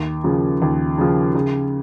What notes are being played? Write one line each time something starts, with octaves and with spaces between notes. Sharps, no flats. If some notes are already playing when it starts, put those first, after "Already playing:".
Already playing: D#2
C#3 F3
D#2
C#3 F3
C#3